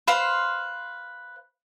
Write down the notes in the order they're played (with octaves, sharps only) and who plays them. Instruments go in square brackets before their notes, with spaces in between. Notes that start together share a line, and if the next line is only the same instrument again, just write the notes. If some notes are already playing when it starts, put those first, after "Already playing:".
[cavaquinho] B4 C5 F5 C6